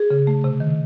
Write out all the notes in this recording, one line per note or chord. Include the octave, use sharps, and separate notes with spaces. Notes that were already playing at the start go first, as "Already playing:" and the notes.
Already playing: G#4
C#3
A3
C3
D#3